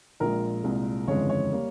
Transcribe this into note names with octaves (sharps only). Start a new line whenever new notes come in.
A#1 A#2 G#3 A#4
C2 A#2 G#3
G1 F2 C#3 E3 G#3 C#5
C#5
G3 A#3